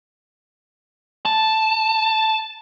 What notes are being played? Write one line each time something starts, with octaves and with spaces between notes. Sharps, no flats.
A5